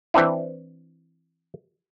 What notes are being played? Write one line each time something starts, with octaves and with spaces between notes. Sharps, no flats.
E3 C4 D4 E4